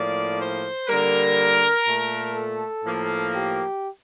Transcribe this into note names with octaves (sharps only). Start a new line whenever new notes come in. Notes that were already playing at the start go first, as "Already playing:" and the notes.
Already playing: A2 F3 A#3 D5
C5
D3 G3 A#3 A#4
A#2 A3
A4
A2 F3 A#3
G4